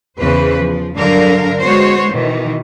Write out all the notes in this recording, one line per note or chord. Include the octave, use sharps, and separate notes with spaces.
E2 C#3 E3 B4 C5
F3
G2 D3 F#3 A#4 F5
G#3 B3 F#4 C5 C#5
B2 D#3 E3